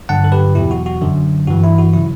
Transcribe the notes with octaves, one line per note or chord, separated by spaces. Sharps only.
G2 D3 F#3 F#5 A5
A4
G4 B4
E2 B2 F#3 E4 G4
F#4
F#4
F#2 D3 F#3
G2 E3 F#4
E4
F#4
C#3 F#3 E4